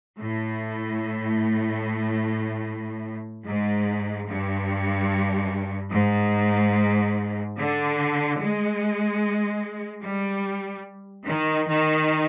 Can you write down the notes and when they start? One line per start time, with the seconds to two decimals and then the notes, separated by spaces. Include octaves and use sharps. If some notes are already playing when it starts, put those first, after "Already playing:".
0.18 A2
3.46 G#2
4.28 G2
5.92 G#2
7.57 D3
8.39 G#3
10.02 G3
11.26 D#3
11.67 D#3